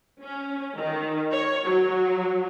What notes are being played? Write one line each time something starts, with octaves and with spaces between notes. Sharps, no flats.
C#4
D#3
C#5
F#3